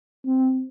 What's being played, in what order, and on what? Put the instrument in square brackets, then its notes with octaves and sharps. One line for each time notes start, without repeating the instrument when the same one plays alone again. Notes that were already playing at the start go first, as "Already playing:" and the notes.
[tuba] C4